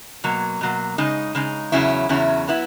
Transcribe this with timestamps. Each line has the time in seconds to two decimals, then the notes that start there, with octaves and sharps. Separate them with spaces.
0.24 B2 F#3 A#3
0.61 B2 F#3 A#3
0.98 C#3 G#3 D#4
1.35 C#3 G#3 D#4
1.72 E2 C#3 F#3 C#4 E4
2.09 E2 C#3 F#3 C#4 E4
2.48 F#3 B3 E4